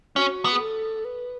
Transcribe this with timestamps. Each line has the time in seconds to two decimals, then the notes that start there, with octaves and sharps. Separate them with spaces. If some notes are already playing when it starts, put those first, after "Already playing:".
0.16 C#4 F#4
0.45 B3
0.52 G#4
0.60 A4
1.05 B4